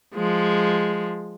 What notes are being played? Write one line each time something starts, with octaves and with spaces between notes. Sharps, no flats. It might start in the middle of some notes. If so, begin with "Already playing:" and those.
F3 G#3